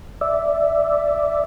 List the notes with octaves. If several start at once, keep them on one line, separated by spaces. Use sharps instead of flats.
D5 E5